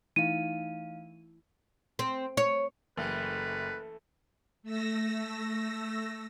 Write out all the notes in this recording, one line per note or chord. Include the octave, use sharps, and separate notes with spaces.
E3 A3 D#4 E4 F5 D#7
C4
C#5
F#1 E3 A3 B4
A3 E6 A#6